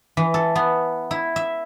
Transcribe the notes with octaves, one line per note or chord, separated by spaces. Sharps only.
E3
A4
B3
E4
E5